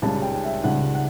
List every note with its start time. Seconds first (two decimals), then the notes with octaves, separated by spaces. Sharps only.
0.02 C#2 C#3 G3 A5
0.22 G5
0.43 E5
0.64 C#2 C#3 G3 F#5
0.95 F#5